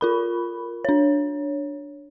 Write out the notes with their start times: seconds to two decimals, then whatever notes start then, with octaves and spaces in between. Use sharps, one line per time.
0.01 F4 A#4 B5
0.85 D4 C#5